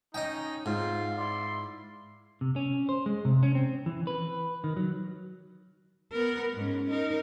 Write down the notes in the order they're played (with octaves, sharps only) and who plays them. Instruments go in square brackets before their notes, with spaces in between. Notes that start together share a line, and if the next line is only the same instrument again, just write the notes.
[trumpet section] C#4 D#4 [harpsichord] D#5 G5
[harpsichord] G#2 [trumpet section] C4 F4
[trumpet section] E4 D5 C6
[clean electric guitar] C3
C#4
C5
G#3
C3
C#4
C4
E3
B4
D#3
F#3
[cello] B3 A#4
G#2 C#4
D#4 A#4